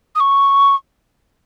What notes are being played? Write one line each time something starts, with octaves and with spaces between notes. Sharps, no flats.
D#6
C#6